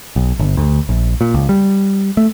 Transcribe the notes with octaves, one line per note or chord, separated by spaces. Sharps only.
B1
G1
D2
A#1
A#2
C#2
G3
A3